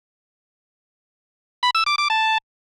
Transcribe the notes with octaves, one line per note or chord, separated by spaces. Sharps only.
B5
E6
D6
D6
A5